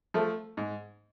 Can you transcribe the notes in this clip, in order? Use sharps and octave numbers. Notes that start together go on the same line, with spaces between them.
F3 A3
G#2